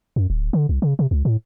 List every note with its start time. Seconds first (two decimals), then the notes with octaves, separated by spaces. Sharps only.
0.16 F#2
0.30 D1
0.53 D3
0.69 C2
0.82 C#3
0.99 C3
1.11 C#2
1.25 A2